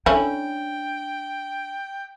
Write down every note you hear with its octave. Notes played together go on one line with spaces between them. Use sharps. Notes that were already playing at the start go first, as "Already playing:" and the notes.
A3 C#4 D4 E4 G5